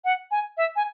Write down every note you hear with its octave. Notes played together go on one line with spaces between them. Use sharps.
F#5
G#5
E5
G#5